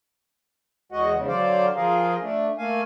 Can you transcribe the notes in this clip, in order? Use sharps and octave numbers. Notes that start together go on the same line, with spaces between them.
E2 G#3 F#4 D#5 F#5
E2 G#2 C#3
D3 F#3 C5 D5 F5
F3 F4 G#4 A#4 F5
A3 D4
A3 A#3 F5 G#5